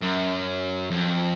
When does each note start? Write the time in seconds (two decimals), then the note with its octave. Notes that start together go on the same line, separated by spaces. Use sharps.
0.02 F#2
0.91 F2